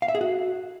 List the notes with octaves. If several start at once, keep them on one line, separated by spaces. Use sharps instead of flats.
F5
E5
G#4
F#4